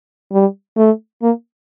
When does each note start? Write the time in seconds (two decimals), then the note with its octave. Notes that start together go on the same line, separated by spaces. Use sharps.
0.32 G3
0.77 A3
1.23 A#3